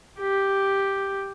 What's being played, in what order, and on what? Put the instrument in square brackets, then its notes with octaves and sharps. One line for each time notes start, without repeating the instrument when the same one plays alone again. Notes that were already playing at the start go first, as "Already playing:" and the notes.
[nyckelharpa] G4